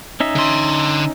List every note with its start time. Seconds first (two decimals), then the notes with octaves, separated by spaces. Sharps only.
0.20 C#4 D#4 E5
0.35 D3 C6